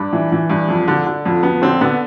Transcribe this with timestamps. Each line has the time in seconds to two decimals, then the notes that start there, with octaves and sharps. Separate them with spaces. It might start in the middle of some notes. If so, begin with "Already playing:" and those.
Already playing: G2 D4
0.13 E3
0.32 E3
0.50 G2
0.68 F2
0.88 D3
1.06 D3
1.25 F2
1.43 F2 B3
1.62 D3 C4
1.81 D3 B3